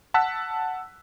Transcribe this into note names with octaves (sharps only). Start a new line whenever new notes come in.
F#5 A5 E6 F#6 B6